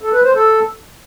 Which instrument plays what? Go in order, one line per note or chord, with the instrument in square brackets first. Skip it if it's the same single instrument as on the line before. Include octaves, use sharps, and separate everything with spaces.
[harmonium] A4
B4
C5
A4